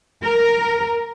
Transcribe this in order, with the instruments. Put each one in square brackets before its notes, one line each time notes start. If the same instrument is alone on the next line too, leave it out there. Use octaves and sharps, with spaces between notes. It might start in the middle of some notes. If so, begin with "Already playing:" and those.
[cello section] A#4